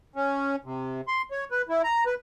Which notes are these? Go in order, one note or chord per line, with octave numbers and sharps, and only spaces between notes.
C#4
C3
C6
C#5
B4
E4
A#5
B4